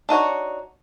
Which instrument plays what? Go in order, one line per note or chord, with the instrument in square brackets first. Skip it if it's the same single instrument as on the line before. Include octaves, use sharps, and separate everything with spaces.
[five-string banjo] D4 D#4 F#4 C#5